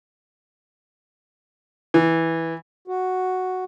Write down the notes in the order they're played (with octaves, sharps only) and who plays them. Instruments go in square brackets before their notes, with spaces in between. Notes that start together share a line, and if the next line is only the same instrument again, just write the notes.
[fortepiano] E3
[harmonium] F#4